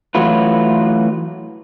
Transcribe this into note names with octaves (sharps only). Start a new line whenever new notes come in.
E3 F#3 A3 F4 F#4 B4